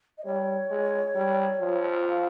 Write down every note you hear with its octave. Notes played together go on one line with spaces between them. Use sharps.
D#5
G3 C#5
G#3
G3
F3
F5